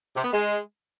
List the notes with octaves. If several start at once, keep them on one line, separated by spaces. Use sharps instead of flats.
C3
B3
G#3